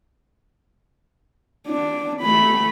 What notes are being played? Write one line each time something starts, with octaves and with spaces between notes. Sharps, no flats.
D4
A3 B5